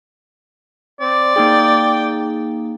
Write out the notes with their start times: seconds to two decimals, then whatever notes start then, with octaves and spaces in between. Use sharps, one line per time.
1.01 C4 D5
1.36 A#3 D#4 G#4 G5